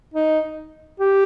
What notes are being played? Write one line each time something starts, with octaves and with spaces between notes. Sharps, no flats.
D#4
G4